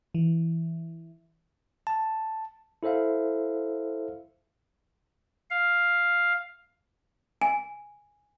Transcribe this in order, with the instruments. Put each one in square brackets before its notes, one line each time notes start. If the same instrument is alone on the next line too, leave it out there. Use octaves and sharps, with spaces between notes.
[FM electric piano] E3
[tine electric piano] A5
E4 A4 C5 E5 F5
[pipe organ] F5
[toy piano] G#5